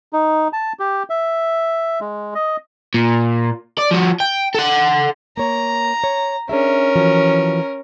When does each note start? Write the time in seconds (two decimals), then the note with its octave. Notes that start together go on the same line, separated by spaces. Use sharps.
0.13 D#4
0.53 A5
0.79 G4
1.10 E5
2.01 G#3
2.35 D#5
2.94 A#2
3.78 D5
3.91 F3 F#4
4.20 G5
4.55 A4 F#5
5.37 A#3 C#5 A#5
6.04 C#5
6.49 C#4 D4 G#4 A#4 E5
6.95 E3 F3 F#4